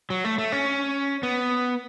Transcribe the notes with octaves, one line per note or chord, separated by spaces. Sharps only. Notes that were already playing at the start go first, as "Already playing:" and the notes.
F#3
A3
A3
C#4
B3